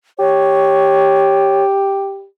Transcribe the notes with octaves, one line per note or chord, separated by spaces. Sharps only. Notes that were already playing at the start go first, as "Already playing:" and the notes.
G4 C#5